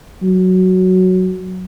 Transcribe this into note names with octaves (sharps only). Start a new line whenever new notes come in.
F#3